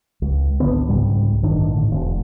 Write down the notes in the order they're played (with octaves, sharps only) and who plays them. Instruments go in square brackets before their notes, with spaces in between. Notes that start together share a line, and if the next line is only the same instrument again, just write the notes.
[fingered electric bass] C#2
G#1 C#2 D3 B3
C2 G#2 C#3 G3
A1 G2 D#3 D4
A2 D3
E1